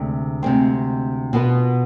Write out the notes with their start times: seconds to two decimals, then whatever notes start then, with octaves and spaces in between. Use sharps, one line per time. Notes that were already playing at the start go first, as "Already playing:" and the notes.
Already playing: D2 C3 G#3
0.43 D2 C3 G#3 C4
1.33 B2 B3 F4 B4